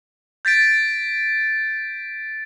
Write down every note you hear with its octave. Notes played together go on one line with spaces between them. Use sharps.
G6 A6 B6 D7